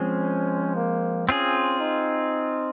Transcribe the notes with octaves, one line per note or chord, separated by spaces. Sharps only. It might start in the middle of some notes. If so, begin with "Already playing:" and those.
Already playing: F3 G#3 C4 C#4
A#3
C4 C#4 F4 G#4
D#4